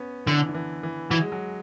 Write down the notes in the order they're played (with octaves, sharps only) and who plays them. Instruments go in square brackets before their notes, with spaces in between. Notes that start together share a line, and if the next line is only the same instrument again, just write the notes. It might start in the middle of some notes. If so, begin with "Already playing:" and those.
Already playing: [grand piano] B3 C#4
[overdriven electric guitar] D3 [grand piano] E3
[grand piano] D3
E3
E3
[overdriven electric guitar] E3 [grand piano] F#3
[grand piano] G#3
F#3